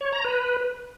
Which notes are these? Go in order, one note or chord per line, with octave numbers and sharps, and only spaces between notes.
C#5
A#5
B4